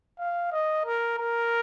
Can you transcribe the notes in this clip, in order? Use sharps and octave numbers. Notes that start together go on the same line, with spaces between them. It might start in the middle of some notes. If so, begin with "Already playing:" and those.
F5
D#5
A#4
A#4